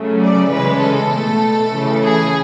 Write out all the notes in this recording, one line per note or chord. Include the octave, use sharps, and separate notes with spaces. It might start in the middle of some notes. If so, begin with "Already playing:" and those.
Already playing: C#3 F#3 A3
D5
C#3 E3 G#3 B4
A4
B2 A3
C#3 E3 A3
G#4